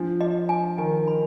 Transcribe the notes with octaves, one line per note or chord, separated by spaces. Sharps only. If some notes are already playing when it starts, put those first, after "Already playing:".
Already playing: F3 D4
D#5
G#5
D#3 G#5
B5